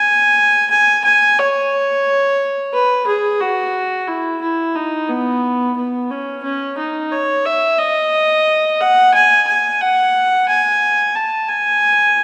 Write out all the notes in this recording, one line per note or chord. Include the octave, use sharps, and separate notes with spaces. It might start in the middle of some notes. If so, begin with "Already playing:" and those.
Already playing: G#5
G#5
G#5
C#5
B4
G#4
F#4
E4
E4
D#4
B3
B3
C#4
C#4
D#4
C#5
E5
D#5
F#5
G#5
G#5
F#5
G#5
A5
G#5